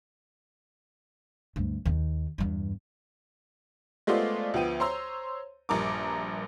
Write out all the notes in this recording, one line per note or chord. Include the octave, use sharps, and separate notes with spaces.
D2 G2
D#2 D#3
E2 G2
G#3 A3 B3 F4 C5 D5
D2 F3 B3 G5 D#7
C5 C#5 A#5 C6 E6
A#1 G2 A#4 D6